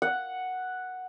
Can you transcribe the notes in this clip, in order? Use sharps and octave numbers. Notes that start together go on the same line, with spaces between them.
F#5